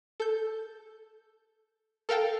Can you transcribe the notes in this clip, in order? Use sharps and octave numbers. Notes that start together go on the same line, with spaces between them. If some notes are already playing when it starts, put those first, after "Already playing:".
A4 G6
A4 A#4 F5 G5 A5